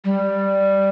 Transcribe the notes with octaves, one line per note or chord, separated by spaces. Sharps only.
G3